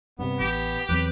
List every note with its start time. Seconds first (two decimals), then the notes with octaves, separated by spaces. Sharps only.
0.19 G2 C3 B3
0.40 A1 G4
0.89 E2 F#3 C4 B4 D6